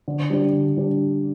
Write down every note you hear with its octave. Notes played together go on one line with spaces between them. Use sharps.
D3
G3 D4
D3
G3 D4